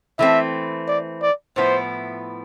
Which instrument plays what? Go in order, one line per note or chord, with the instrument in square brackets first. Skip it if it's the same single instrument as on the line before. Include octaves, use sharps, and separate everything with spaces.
[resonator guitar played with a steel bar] E3 A3 C4 [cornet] E5
[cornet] D5
D5
[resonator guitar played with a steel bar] A2 F3 B3 E4 [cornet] C5